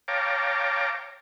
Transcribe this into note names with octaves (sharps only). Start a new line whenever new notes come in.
C#5 F5 G5 A5 A#5 D6